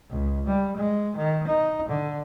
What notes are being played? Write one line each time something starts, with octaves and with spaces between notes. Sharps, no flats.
C#2
G3
G#3
D#3
D#4
D3